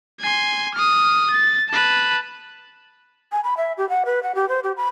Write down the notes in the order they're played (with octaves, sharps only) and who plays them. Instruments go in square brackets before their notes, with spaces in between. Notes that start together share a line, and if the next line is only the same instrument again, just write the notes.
[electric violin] G#5 C6
D#6 F6
A6
B4 A5
[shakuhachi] G#5
B5
E5
G4
F#5
B4
F#5
G4
C5
G4
B5